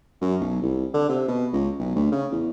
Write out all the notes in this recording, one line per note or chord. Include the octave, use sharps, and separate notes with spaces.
F#2
B1
C2
D3
C3
B2
C#2
B1
D2
C#3
E2